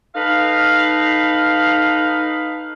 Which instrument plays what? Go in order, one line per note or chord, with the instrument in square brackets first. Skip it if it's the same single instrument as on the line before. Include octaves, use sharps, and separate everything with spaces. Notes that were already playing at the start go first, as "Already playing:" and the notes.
[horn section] D#4 A4 B4 F5